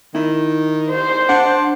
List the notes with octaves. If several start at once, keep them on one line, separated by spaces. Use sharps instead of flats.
D#3 E4
C5
D4 F#5